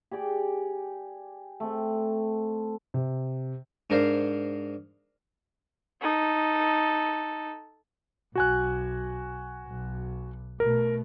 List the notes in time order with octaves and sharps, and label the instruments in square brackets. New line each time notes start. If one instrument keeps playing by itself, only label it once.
[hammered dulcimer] G4 G#4 D5 G5
A3 C4
[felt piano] C3
[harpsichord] G#2 D4 A#4 C5 F5
[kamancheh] D#4 A4
[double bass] B1 [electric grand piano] F#4 G#5 F#6
[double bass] B1
[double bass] B2 A3 [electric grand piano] A#4